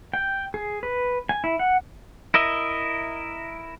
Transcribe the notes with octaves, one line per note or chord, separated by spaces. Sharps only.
G5
G#4
B4
G#5
E4
F#5
E4 A#4 D#5 E5